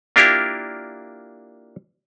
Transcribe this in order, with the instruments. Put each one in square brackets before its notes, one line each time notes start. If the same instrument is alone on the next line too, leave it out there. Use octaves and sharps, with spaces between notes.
[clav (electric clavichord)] A#3 D4 E4 F4 G4 A#4